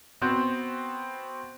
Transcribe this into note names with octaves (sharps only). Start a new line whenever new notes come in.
B3 C4 F#4 C5